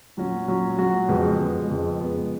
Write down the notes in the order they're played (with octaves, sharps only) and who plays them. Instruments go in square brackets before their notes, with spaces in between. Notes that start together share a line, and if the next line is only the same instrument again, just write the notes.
[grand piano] A#2 F#3 C#4 F#4
A#2 F#3 C#4 F#4
A#2 F#3 C#4 F#4
F2 C#3 G#3 B3
F2 C#3 G#3 B3
F2 C#3 G#3 B3
F2 C#3 G#3 B3